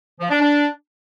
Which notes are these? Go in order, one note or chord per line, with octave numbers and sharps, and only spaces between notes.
F3
D4
D4